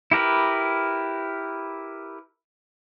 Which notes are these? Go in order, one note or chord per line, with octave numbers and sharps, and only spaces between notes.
E4 G4 A#4 B4